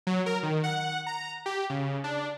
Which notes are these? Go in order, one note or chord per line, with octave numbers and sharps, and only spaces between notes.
F#3
A#4
D#3
F#5
A#5
G4
C#3
D4